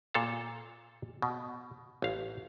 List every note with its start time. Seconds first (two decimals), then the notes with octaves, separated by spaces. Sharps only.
0.14 A#2 A4 F5
1.22 B2
2.02 A1 F5